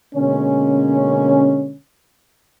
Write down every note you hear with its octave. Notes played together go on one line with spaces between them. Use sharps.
B2 D3 G#3 A#3 C#4